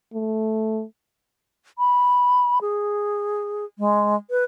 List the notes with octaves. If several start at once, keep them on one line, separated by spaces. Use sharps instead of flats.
A3
B5
G#4
G#3
B4